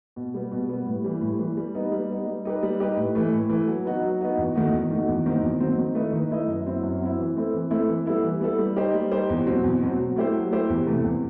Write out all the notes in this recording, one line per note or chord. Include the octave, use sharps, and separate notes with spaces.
B2
G3 B3
B2
G3 B3
A2
E3 G3
A2
E3 G3
G3
B3 D#4
G3
B3 D#4
G3
D#4 G4 B4
G3
D#4 G4 B4
A2
E3 A3
A2
E3 A3
F#3
B3 D#4 F#4
F#3
B3 D#4 F#4
E2
D#3 A3 D#4 F#4
E2
D#3 A3 D#4 F#4
E2
D#3 F#3 C4
E2
D#3 F#3 C4
D#3
A3 E4 B4 D#5
D#3
A3 E4 B4 D#5
F#2
F#3 C4 E4
F#2
F#3 C4 E4
E3
A3 C4 E4 A4
E3
A3 C4 E4 A4
E3
G3 B3 E4 A4
E3
G3 B3 E4 A4
G3
D#4 G4 C5
G3
D#4 G4 C5
E2
B2 F#3 C4
E2
B2 F#3 C4
F#3
A3 E4 G4 C5
F#3
A3 E4 G4 C5
E2
C3 E3 A3
E2